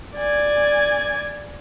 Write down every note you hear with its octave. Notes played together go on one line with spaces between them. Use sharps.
D5 G#5